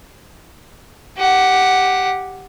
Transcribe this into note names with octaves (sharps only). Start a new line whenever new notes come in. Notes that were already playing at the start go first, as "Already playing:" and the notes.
G4 F#5